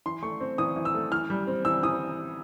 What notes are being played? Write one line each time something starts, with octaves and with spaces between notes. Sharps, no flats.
E3 C6
A3 C#6
C4
E3 D#6
E3
E6
A3
E3 F6
G3
C4
E3 E6
E3 D#6